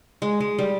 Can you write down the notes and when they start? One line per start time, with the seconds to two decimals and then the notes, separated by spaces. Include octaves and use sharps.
0.22 G#3
0.40 G#3
0.59 G3